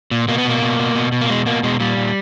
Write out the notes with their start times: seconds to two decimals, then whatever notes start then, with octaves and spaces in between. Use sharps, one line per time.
0.11 A#2
0.28 B2 A#3
0.38 B3
0.45 B2 A#3
0.62 B2
0.79 B2
0.95 B2
1.12 B2
1.21 A#3
1.29 B2 G#3
1.46 B2 A#3
1.63 B2 G#3
1.80 A#2 G3
1.97 A#2